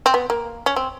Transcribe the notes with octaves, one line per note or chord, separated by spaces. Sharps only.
C4
B3
A#3
C#4
C4